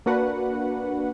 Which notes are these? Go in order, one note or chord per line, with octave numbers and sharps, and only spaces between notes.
A#3 D4 F#4 B4 F#5